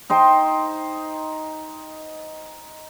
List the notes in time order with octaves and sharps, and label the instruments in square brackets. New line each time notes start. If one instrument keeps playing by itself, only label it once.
[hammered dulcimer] D#4 C5 G5